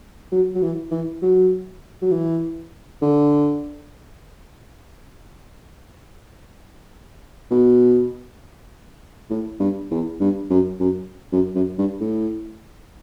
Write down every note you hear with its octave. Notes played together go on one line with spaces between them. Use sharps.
F#3
F#3
E3
E3
F#3
F#3
E3
D3
B2
A2
G2
E2
G2
F#2
F#2
F#2
F#2
G2
A2